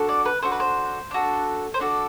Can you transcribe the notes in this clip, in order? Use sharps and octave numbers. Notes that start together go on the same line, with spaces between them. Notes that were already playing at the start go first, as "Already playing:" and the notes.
Already playing: D4 F#4 A4
D5
B4
D4 F#4 A4 C5
B4
C5
D4 F#4 A4
C5
D4 F#4 A4 D5